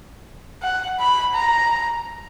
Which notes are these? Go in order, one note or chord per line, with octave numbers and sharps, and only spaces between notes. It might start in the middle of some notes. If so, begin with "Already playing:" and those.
F#5
B5
A#5